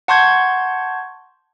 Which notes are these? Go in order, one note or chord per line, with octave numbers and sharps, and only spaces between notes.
F#5 A5 C6 C#6 G6 G#6